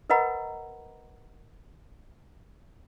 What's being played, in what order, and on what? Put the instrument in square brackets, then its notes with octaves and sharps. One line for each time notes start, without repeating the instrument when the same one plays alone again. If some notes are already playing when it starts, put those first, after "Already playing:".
[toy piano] A#4 B4 D#5 F#5 A#5 B5